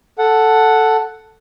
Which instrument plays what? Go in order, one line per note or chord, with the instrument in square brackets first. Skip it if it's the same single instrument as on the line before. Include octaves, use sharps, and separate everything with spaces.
[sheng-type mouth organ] A4 F#5